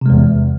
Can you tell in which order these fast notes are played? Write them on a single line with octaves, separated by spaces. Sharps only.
C3 G#3 E2